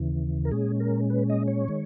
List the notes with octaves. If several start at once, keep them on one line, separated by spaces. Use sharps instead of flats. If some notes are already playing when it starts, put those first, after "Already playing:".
Already playing: D#2 C#3 E3
A#4
A#2 G#3 C#4 G#4
A#4
B4
D#5
C#5
D#3 G#3